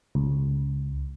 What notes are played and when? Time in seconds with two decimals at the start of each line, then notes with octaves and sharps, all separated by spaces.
0.15 C#2